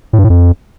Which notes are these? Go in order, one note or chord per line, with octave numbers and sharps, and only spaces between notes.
A2
G2
A2
F2